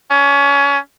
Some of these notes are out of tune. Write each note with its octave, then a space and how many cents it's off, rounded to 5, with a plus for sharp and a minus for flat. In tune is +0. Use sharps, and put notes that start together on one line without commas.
C#4 +25